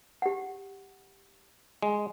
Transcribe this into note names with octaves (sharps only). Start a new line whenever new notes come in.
G4 F#5
G#3